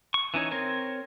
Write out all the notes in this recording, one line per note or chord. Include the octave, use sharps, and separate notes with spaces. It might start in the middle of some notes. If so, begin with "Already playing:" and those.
C#6
E3 C#4 D#4 C#5
C4 A#4 C#5